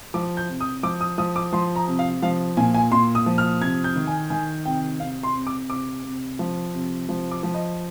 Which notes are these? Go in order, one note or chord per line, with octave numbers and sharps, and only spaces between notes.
F3 D6
G6
C3
D#6
F3 D6
D#6
F3 D#6
D6
F3 C6
A#5
C3
F5
F3 F5
A#2 G#5
G#5
A#2 C6
D#6
F3
F6
C3 G#6
G6
D#3
G#5
D#3 G#5
C3 G5
C3 F5
C6
C3
D6
C3 D6
C3
F3
C3
F3
D6
F3
D#5